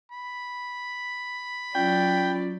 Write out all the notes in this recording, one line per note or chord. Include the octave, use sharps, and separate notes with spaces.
B5
F#3 C#4 F4 D5 G5